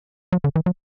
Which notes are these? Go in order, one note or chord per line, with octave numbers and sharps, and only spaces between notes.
F#3
D3
E3
F#3